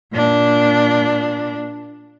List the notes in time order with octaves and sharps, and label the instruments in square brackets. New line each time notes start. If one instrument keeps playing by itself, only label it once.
[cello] A#2 D4